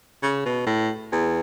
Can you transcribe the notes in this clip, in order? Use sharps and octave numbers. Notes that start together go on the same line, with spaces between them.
C#3
B2
A2
E2